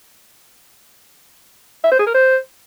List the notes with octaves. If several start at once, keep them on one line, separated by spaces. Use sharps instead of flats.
E5
C5
G#4
A#4
C5